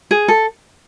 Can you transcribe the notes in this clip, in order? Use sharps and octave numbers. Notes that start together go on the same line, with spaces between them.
G#4
A4